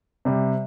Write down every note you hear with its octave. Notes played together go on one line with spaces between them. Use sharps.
C3 G3